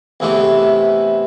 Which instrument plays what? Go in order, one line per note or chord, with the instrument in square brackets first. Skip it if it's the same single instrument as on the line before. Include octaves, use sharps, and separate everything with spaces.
[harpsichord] E2 C3 E3 A3